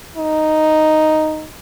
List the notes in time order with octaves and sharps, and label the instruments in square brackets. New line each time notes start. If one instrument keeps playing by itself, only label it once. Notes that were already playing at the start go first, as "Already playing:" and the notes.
[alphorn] D#4